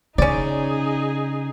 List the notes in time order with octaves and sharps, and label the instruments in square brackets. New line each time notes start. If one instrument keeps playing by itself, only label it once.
[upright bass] C#3 [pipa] C#4 D5 [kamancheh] D#4 G#4